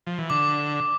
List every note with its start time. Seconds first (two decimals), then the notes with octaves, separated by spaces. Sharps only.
0.07 F3
0.18 E3
0.30 D3 D6